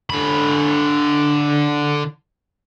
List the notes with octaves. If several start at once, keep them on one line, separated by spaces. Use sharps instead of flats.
D3 B5